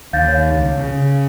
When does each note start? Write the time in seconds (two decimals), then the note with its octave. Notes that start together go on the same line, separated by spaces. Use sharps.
0.13 D#2 F5 G6 A6
0.28 C#5 F5
0.54 C#2
0.78 C#3